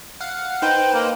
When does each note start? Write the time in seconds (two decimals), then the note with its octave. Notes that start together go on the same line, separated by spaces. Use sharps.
0.21 F5 F#5
0.62 D#4 B4 C5 G5
0.94 A#3